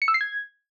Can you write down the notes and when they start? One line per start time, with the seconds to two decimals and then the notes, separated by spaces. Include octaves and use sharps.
0.02 C#7
0.08 E6
0.14 C7
0.21 G#6